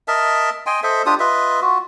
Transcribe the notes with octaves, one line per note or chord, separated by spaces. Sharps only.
A#4 D#5 E5 A5
D#5 G5 G#5 C6
A4 C5 D#5 E5
D4 F4 G4 D#6
F4 B4 D#5 E5
F4 F#4